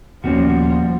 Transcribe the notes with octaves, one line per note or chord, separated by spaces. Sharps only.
D#1 F3 G3 A#3 B3 C#4 F#4